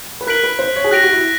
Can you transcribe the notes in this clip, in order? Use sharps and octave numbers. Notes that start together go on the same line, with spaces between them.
B4
A#4 F#6 B6 D7 F#7
B4
C5
C#5
G#4
G4 F#6 A#6 D7 F7
F#4
E4